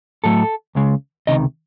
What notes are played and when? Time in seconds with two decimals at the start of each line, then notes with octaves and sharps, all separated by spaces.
0.24 A2 F#3 A3 A4
0.75 C#2 C#3 G#3
1.27 C#2 C3 D#3 D#5